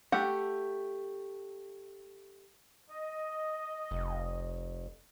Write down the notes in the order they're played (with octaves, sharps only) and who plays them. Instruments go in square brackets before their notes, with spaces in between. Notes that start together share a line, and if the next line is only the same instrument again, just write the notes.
[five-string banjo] A3 G4 F#5
[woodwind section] D#5
[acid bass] F1